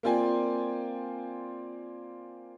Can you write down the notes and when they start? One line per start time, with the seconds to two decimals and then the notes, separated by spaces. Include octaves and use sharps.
0.03 A#3 C4 F4 D5 G5 G#5